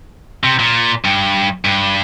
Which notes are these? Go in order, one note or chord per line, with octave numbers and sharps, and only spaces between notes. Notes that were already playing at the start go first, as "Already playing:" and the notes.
C3
A#2
G2
G2